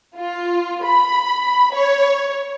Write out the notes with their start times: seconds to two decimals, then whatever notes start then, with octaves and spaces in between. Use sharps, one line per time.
0.17 F4
0.84 B5
1.75 C#5